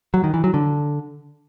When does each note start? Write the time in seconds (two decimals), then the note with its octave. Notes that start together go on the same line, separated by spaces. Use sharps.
0.14 F#3
0.24 D#3
0.34 E3
0.44 F#3
0.54 D3